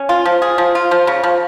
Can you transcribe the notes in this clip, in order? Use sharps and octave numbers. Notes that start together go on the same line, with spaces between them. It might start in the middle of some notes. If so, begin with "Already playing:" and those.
Already playing: C#4
F4
F3
G#4
F3
F4
F3
C#3
F3